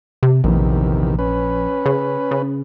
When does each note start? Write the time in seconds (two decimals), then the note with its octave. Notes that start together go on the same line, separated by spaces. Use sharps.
0.23 C3
0.44 A#1 E2 C3 D#3
1.19 C#4 B4
1.86 C#3
2.31 C#3